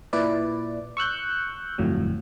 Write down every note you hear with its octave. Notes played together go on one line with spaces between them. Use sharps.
A#2 E4 B4 D5
C#6 E6 F#6 G6
G1 F2 A2 F#3